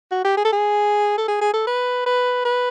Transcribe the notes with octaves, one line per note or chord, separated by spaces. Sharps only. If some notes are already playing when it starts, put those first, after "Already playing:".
F#4
G4
G#4
A4
G#4
A4
G#4
G#4
A4
B4
B4
B4